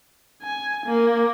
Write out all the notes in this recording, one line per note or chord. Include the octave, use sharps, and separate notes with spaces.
G#5
A#3